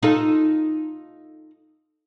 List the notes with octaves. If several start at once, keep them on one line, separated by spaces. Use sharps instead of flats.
D#4 F4 A4